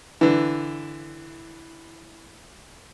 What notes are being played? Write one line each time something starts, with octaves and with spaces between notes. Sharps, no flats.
D3 E3